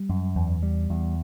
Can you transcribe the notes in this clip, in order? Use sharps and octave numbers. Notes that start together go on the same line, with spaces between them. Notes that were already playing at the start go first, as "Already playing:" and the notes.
Already playing: G3
F#2
E2
G3
E2